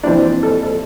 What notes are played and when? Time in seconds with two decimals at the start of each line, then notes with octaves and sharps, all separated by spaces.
0.03 E3 C4 D4 E4 D5
0.23 C4 C5
0.43 A4
0.63 A4